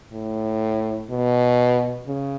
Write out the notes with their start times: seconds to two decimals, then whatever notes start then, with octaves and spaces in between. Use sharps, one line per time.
0.12 A2
1.10 B2
2.07 C#3